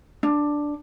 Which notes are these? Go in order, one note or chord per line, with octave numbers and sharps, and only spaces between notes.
D4